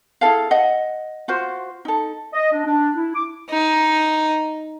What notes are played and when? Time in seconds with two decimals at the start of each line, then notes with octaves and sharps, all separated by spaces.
0.21 E4 G#4 A4 F5
0.51 D#5 F#5
1.28 F4 F#4 C5
1.85 D#4 A4
2.33 D#5
2.52 D4
2.66 D4
2.96 E4
3.15 D6
3.50 D#4